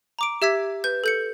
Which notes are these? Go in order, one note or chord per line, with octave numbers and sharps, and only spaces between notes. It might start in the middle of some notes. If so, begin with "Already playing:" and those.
A#5 D6 D7
G4 E5 E6 G#6 B6
B4 G6
A4 G6 C#7